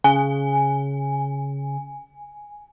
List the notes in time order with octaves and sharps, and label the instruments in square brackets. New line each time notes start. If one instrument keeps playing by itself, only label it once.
[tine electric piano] C#3 [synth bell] G#5